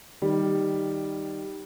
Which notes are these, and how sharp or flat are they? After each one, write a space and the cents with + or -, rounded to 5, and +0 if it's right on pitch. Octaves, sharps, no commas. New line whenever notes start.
D#3 +0 G3 +0